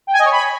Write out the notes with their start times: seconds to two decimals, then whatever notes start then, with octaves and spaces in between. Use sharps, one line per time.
0.07 G5
0.13 G#5
0.19 D#5
0.25 C#5
0.31 B5